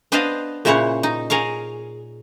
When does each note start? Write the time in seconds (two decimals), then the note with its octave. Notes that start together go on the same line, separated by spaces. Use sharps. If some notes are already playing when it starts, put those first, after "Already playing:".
0.12 B3 D4 B4 C5 D#5 F5
0.65 A#2 C#3 E4 C5 C#5 F#5
1.03 D#4
1.30 G#4 A#4 C#5 F5